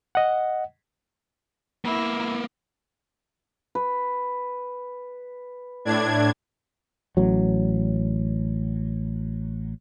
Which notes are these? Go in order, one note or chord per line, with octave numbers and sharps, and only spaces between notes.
D#5 F#5
A#3 B3 E4
B4
A2 D4 G#6
A1 F#3